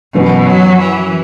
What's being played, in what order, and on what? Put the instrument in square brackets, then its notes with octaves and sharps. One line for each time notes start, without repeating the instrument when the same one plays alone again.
[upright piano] F#2 E3 B3 F#4 [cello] B2
[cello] F#3
E3